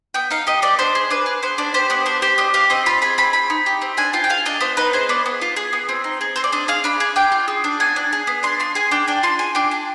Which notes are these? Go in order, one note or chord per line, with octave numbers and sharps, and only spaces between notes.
B3 G5
D#4 F5
G4 D#5
B3 D5
D4 C5
G#4
D4 B4
G#4
B3 C5
D4 D5
G4 C5
B3 D5
D4 C5
G4 C5
D4 D#5
G4 F5
C4 D#5
F4 B5
G#4 B5
C4 B5
C4 B5
D#4
G4
C4
D4 G#5
F4 G5
G5
G#4 F5
D4 D#5
B3 C5
D#4 B4
G#4 C5
B3 D5
B3
F4
G#4
B3
C4
D#4
G#4
C4 C5
D5
D4 D#5
G#4 F5
D4 B5
G#4
D4 G5
F4
G#4
D4
B3 G#5
D4
G#4
B3
D4 C6
F4 C6
G#4 G#5
D4 G5
D4 G5
F4 C6
G#4 G#5
D4 G5
D4